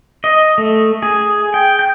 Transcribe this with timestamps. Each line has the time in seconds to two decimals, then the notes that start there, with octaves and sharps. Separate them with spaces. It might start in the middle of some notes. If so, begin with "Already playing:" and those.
0.24 D#5
0.58 A3
1.02 G#4
1.54 G5
1.79 G6